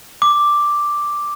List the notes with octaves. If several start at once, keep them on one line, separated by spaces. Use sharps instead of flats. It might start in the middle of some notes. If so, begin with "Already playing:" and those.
D6